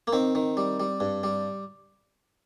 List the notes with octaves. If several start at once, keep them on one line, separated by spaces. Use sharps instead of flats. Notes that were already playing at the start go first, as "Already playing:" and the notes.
A#3
D#3 C4
D#3
G3
G3
G2
G3